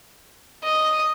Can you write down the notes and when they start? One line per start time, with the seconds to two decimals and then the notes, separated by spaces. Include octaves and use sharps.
0.64 D#5